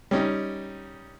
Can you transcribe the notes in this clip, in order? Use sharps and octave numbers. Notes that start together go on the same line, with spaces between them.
G3 C#4 D#4